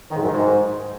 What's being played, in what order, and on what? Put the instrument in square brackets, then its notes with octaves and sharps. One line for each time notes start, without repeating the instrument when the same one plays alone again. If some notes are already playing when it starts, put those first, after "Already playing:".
[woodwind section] D#3
G#2
F#2
D#3
G#2